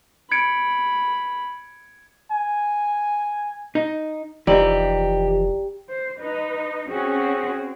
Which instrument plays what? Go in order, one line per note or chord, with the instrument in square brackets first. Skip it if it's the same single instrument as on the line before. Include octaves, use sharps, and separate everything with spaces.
[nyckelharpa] B5 [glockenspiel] G#6 C#7 D7
[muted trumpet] G#5
[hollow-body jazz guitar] D#4
[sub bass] F1 [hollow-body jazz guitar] E3 F3 D#4 [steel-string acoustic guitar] G4 [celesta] D5 A#5 F#7
[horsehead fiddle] C5
[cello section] D#4 [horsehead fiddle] B4 D#5
[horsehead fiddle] C4 [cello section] C#4 F#4 [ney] G#4